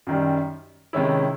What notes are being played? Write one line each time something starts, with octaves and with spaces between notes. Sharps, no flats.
F#2 D#3 G3
C3 D#3 G#3 C#4 E4